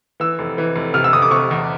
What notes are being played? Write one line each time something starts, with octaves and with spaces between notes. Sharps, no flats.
E3 E6
F1
E3
F1
C3 F6
E6
F1 D#6
D6
C3 C#6
E2